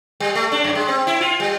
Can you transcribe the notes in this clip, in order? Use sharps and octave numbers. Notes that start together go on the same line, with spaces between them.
G3
A3
D4
F#2
G#3
C4
E4
F4
G3